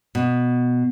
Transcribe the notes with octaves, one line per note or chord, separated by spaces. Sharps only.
B2